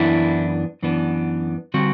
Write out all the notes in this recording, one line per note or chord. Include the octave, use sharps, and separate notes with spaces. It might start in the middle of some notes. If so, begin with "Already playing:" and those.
Already playing: F#2 E3 B3 D4 E4
F#2 E3 B3 D4
D3 G3 C4 F#4